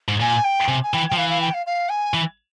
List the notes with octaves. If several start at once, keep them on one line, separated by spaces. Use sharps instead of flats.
G#2
A#2 G#5
G5
C3 G#5
G#5
E3 G5
G5
F3
E3 F5
F5
G5
F5
F5
G#5
E3